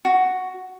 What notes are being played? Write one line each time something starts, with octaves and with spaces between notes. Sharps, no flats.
F#4